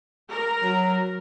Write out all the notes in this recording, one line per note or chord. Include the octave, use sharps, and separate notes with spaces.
A#4
F#3